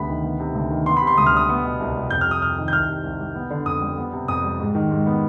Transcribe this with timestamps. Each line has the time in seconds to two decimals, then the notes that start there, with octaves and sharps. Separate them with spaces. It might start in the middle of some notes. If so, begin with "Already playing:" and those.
Already playing: D2 C3 B3 B5
0.09 D#3
0.24 B3
0.40 C3
0.55 D2
0.71 D#3
0.86 B3 C6
0.97 B5
1.01 C3
1.07 C6
1.17 D2 D#6
1.26 F6
1.33 G3 D#6
1.49 B3
1.65 B2
1.80 C2
1.95 G3
2.10 F2 G6
2.21 F6
2.26 C3 D#6
2.42 F2 F6
2.58 D#3
2.68 G6
2.73 C2 F6
2.88 C3
3.04 C2
3.19 G3
3.35 B3
3.50 D3
3.66 F2 D#6
3.81 G3
3.97 B3
4.13 C3
4.28 F2 D#6
4.44 G3
4.59 G#2
4.75 D#3
4.91 G#2
5.06 B3